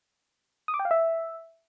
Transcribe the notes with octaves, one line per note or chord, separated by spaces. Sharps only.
D#6
D6
G5
F5
E5